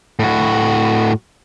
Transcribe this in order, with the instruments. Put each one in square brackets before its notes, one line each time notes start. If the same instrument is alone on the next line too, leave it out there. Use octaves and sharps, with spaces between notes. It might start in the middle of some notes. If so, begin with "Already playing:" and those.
[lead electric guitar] A2 F#4